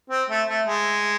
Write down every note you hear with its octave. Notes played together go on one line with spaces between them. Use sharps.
C4
A3
A3
G#3